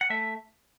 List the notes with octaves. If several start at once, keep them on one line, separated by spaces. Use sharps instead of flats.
F#5
A3 E5